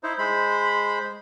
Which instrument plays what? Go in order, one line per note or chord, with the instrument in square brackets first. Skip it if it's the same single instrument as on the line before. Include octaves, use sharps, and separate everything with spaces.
[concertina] D#4 E4 C5
G#3 C5 B5